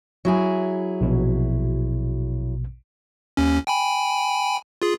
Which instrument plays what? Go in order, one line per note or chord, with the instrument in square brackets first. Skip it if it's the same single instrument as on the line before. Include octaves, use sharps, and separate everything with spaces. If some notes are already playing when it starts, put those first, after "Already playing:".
[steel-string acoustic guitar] F#3 E4 G#4
[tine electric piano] A#1 B2
[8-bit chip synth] D#2 C#4
G5 G#5 B5
F4 G#4